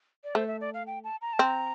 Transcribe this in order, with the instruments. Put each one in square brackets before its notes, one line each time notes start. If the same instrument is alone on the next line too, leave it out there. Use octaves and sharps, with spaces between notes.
[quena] D5
[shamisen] A3 [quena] C5
[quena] E5
D5
F5
G5
A5
A#5
A5
[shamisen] C4
[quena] A#5